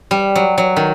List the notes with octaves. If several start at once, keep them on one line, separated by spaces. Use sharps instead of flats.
G3
F#3
F#3
D#3